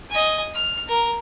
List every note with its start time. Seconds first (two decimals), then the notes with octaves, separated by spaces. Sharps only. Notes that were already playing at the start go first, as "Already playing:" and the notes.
0.10 D#5 G#5
0.55 F6
0.88 A#4